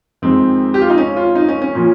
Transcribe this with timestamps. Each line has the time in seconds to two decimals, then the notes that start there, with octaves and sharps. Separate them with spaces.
0.22 F2 D#3 G#3 C4
0.74 G4
0.82 F4
0.90 D#4
0.98 C#4
1.16 F4
1.35 D#4
1.49 C#4
1.62 C#4
1.75 A#2 F3